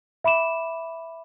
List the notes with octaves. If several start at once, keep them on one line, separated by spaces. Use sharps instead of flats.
E5 B5 D6 E7